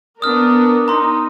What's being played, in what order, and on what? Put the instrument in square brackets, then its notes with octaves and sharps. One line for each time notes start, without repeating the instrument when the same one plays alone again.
[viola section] B3 D4 A#4 [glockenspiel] D#6 F6
[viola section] D#4 [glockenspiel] A#5 C6